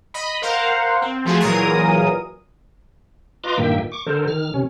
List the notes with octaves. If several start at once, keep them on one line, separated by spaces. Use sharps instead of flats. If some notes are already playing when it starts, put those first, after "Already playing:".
D#5 B5
A#4 C5 F5 F#5
C4
F3 A3 F4 F#4 G#4
A#2 E3 F#3 G#4 A#4 D#6
F4 B4 D#5 A#5 C6 D6
G2 A#2 D#3 A#3 E5 G5
C#6 D6
D3 A4 A#4 C5
D#3 F6
C3 C#4